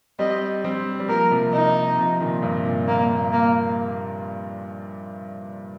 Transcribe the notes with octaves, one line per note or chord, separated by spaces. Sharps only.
G3 C4 D#5
G3 C4
G3
F3 A#3 A#4
C3 F3
D#4
C3 F3
A#2 D#3
G2 C3
A#2
A#3
A#3